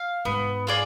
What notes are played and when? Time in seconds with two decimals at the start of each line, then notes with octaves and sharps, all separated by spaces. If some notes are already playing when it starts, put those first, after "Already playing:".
Already playing: F5
0.25 G#2 B3
0.67 F4 G#4 D5